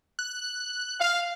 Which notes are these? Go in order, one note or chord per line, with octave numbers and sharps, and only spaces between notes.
F#6
F5